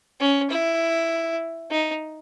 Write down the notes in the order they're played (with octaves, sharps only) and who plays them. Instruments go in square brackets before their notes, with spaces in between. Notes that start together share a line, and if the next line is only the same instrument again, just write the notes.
[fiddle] C#4
E4
D#4